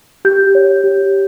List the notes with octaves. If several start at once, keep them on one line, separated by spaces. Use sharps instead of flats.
G4 G6
C#5
G4